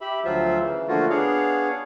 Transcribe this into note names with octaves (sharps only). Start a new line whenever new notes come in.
G4 E5 B5
D2 F3 F#3 F4 C5 E5
C#3 E3
D3 F3 A3 A#3 F4 F#4
B3 D4 G#4 C#5 F5